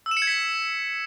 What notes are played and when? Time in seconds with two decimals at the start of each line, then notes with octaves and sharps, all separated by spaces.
0.06 E6
0.11 E7
0.17 C#7
0.22 G#6
0.27 B6